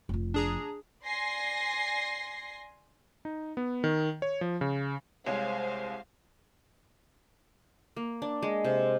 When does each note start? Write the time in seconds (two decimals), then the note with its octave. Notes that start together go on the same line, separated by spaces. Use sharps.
0.09 F1 F3
0.34 D4 G#4 A#5
1.03 D5 G#5 C6 A#6 C7
3.25 D#4
3.57 B3
3.84 D#3
4.22 C#5
4.41 F3
4.61 C#3
5.27 C2 G#3 C5 C#5 F5
7.97 A#3
8.22 D4
8.43 G#3
8.64 C3